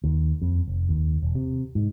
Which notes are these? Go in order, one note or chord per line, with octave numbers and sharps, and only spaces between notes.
D#2
F2
F1
D#2
E1
C3
G#2